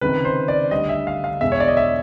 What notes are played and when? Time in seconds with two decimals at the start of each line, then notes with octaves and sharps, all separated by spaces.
0.01 C#2 C3 D#3 B4
0.25 C5
0.48 D5
0.71 D2 D3 G3 D#5
0.89 E5
1.07 F5
1.24 F5
1.41 E2 B2 G#3 E5
1.52 C#5
1.60 D5
1.68 D#5
1.77 E5